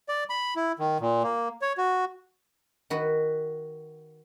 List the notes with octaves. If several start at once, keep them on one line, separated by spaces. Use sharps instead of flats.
D5
B5
E4
D#3
A#2
A#3
C#5
F#4
D#3 F#4 B4